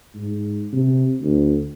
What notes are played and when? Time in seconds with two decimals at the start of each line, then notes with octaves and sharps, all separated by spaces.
0.15 G#2
0.73 C3
1.22 D2